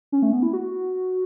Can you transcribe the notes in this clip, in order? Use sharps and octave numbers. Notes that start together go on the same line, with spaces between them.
C#4
A3
B3
E4
F#4